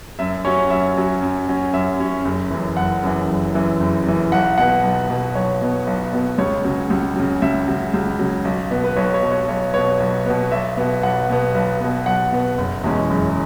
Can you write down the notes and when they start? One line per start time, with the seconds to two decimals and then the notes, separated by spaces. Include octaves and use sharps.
0.19 F#2 E5
0.45 F#3 C#4 C#5
0.70 F#2 E5
0.97 F#3 C#4
1.22 F#2
1.48 F#3 C#4
1.73 F#2 E5
2.00 F#3 C#4
2.25 F#1
2.51 F#2 E3
2.77 F#1 F#5
3.02 F#2 E3
3.29 F#1
3.54 F#2 E3
3.80 F#1
4.06 F#2 E3
4.32 B1 F#5
4.58 B2 B3 F#5
4.84 B1
5.09 B2 B3
5.35 B1 C#5
5.61 B2 B3
5.87 B1
6.13 B2 B3
6.38 C#2 C#5
6.65 C#3 F#3
6.90 C#2
7.16 C#3 F#3
7.42 C#2 E5
7.68 C#3 F#3
7.94 C#2
8.19 C#3 F#3
8.45 B1
8.71 B2 B3
8.84 B4
8.96 B1 C#5
9.14 C#5
9.23 B2 B3
9.32 C#5
9.49 B1 C#5
9.74 B2 B3 C#5
10.00 B1
10.26 B2 B3
10.52 B1 E5
10.77 B2 B3
11.03 B1 F#5
11.29 B2 B3
11.55 B1
11.81 B2 B3
12.06 B1 F#5
12.32 B2 B3
12.58 F#1
12.84 E2 B2 G#3 C#4
13.10 F#1